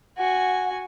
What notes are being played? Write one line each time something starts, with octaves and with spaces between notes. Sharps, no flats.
F#4 F#5 G#5